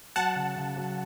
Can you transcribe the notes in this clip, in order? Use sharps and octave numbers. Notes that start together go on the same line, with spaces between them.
F#3 F#5 A5
C#3
C#3
F#3